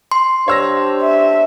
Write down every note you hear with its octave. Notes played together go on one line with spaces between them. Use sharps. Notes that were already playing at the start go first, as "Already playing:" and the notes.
C6
D4 G4 C5 C#5 E6 A#6
E5